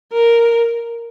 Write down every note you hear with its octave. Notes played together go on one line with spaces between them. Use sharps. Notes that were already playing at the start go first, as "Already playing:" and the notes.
A#4